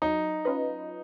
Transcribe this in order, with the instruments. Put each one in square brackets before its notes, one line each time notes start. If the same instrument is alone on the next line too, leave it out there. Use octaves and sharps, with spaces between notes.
[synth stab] F#3 [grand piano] D#4
[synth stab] C#4 F4 B4 D#5